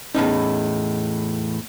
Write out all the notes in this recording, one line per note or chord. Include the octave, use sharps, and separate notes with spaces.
E2 A2 C#4 D#4